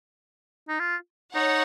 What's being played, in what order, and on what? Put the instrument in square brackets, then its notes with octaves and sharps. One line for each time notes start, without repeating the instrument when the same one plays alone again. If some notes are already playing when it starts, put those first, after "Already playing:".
[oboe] D#4
F4
[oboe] D#4 [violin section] C#5 F#5